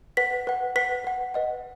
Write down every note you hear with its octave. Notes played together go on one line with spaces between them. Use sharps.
B4 F#5 B6
B4 F#5
B4 F#5 B6
B4 F#5
B4 D#5 F#5